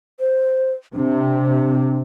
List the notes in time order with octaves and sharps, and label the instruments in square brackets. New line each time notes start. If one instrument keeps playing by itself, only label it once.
[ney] C5
[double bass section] C3 [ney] D4